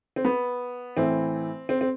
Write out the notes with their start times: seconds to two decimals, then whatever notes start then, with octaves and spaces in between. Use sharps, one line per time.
0.16 C4
0.25 B3
0.97 A2 E3 C4
1.69 C4
1.81 C4